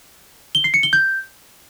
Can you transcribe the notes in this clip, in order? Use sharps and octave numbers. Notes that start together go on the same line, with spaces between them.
G7
C7
C#7
G7
G6